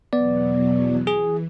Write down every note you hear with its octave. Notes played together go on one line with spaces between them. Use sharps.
E2 B2 F#3 B3 D5
E3 G#4